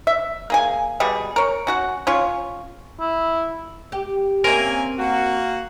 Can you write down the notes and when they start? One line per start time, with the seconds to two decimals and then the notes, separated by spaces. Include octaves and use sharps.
0.07 E5
0.50 A#3 G#4 G#5
1.00 B2 G3 G#4
1.36 A#4 C#5
1.67 C#4 F#4 F#5
2.07 C#4 F4 C#5
3.00 E4
3.92 G4
4.44 A#3 C4 C#4 A#4 E5 G#5
4.99 A#3 F#4